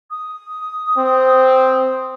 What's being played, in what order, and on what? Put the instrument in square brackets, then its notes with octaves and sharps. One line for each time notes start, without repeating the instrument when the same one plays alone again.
[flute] D#6
[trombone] C4